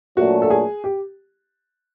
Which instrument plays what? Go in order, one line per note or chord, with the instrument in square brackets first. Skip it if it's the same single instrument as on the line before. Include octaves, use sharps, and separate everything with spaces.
[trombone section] A#2 F#3 A3 D4 [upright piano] F#4
[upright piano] A4
G#4
G4